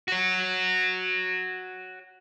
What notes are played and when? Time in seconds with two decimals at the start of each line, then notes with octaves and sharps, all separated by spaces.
0.08 F#4 C#5